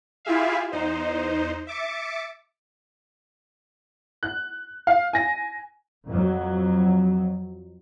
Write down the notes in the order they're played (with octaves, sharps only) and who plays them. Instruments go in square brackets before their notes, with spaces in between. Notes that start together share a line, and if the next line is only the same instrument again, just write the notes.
[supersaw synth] E4 F4 G4 G#4 E5 F5
E2 D#4 C5
E5 D6 A6 C#7
[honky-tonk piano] F#6
F5
G#5 A#6
[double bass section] F2 F#3